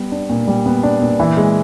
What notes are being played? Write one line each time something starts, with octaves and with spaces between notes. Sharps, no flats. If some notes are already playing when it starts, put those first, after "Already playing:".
Already playing: G3 B3
D4
A#2
G3
B3
D4
A#2
E3
G#3